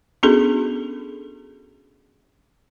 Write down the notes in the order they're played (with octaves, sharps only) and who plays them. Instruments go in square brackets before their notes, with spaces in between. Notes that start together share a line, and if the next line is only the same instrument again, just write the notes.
[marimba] B3 C#4 D4 F#4 G#4 A4